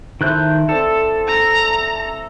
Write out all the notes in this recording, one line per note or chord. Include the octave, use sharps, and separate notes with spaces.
D#3 E4 A4 C5 F#6 G6
C4 A4 D5 A5
A#5